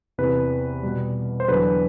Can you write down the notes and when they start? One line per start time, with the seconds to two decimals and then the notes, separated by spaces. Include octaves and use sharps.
0.18 E2 C3 E3 B4
0.83 B2 G3
1.40 C5
1.48 E2 D3 F#3 B4